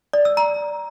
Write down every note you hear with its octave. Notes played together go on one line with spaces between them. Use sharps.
D5
E6
A#5